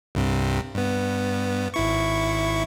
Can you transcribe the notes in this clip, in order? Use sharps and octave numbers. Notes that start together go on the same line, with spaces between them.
C2 G2 C3
G2 B3
G#1 E4 C#6